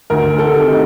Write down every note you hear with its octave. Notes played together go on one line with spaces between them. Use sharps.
D2 A#4
A4
C3 D#3
D#4